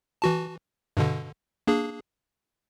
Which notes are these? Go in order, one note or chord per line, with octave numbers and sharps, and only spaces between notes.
E3 F#4 A5
G2 B2 D3
A#3 D4 G#4